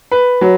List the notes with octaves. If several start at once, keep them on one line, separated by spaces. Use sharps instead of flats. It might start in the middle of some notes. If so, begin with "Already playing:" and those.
B4
F#3